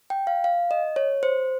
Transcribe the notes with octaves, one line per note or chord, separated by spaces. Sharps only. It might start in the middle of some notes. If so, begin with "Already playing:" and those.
G5
F5
F5
D#5
C#5
C5